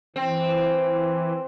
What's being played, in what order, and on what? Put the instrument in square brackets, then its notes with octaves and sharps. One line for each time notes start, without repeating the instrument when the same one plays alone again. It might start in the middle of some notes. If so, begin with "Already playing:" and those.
[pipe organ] E3 [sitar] C4